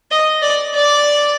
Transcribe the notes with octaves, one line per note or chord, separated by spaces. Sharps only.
D#5
D5
D5